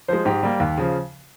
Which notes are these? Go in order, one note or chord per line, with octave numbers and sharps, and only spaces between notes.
F3 G#3 C5
G#2 G4
G3 A#3
D#2
C#3 F3